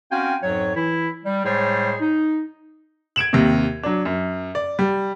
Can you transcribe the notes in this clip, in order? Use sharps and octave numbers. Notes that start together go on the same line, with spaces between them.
C4 C#4 F#4 F5 G5 G#5
F2 G#2 F#3 C#5
E3 E4
G3
A2 G3 G#3 G#4 C5 C#5
D#4
G#6 D7 E7 F#7
D#2 C3
F#3 D4
F#2
D5
G3